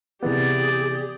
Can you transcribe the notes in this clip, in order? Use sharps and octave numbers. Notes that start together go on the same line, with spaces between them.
C3 E3 B3 G4 G#4 D5